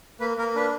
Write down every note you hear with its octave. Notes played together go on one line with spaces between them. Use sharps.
A#3 B4
A#3 A#4
D4 B4